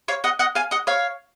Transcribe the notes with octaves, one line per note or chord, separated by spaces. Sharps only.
C#5 F5
D#5 F#5
D#5 F#5
F5 G#5
D#5 F#5
C#5 F5